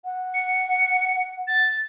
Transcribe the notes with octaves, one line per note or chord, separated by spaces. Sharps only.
F#5
C#7
A6